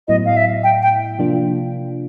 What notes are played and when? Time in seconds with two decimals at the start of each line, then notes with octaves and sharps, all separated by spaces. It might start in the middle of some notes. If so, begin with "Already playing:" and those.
0.08 A2 F#3 B3 E4 D#5
0.25 F5
0.37 E5
0.64 G5
0.82 G5
1.19 C3 F3 A#3 D4 F4